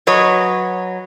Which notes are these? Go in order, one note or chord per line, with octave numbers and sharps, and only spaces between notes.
F#3 B4 C#5 D#5